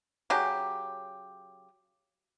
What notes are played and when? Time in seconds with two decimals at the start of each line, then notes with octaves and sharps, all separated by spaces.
0.30 C#3 F#3 G4